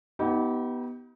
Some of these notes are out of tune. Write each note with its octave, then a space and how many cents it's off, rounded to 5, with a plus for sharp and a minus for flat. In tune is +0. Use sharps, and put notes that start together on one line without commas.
B3 -5 D#4 +30 G4 -25